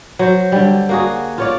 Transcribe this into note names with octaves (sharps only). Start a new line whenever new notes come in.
F#3 C5
D3 G3
A#3 F#4 G#4
F4 C#5 D5